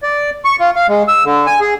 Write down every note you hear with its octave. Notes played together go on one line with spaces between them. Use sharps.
D5
C#6
F4
F5
G#3
E6
D3
G#5
G#4